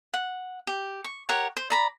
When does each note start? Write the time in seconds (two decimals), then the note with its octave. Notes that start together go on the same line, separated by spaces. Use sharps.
0.14 F#5
0.67 G4
1.04 C#6
1.29 G4 A#4 C#5 F#5
1.57 C5
1.70 D5 A#5 B5